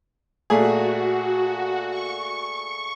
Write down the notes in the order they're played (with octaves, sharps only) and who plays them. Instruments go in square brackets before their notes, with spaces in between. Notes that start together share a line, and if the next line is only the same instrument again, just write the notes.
[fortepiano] A#2 A3 G#4 [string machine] F#4
[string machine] C#6